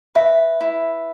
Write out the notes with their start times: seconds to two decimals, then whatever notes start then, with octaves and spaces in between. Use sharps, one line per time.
0.15 B4 E5
0.61 E4